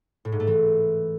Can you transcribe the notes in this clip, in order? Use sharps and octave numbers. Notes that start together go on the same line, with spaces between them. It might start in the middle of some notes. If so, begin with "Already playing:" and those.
A2
G#2
A3
E3